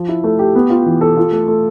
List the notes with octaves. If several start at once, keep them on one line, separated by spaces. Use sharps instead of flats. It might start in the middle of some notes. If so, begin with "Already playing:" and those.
Already playing: F3
E4
A3
G4
B3
F4
E3
A4
F4
A3
A3